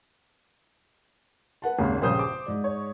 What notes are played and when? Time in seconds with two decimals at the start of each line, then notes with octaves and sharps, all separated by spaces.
1.62 B4 F#5 A5
1.79 G#1 D#2 C#3 C6
2.02 A#1 G2 C#3 C5 D#6 G6
2.19 D6
2.46 G#2 D5
2.64 C#5